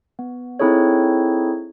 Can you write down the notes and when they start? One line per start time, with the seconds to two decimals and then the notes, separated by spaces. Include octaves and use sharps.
0.19 B3
0.59 C4 D#4 E4 G#4 A4 C#5